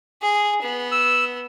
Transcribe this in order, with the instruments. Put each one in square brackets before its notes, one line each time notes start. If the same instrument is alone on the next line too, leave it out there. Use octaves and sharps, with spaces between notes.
[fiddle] G#4
B3
[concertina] E6